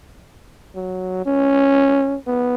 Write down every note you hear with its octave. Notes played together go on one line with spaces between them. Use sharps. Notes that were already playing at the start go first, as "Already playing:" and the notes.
F#3
C#4
B3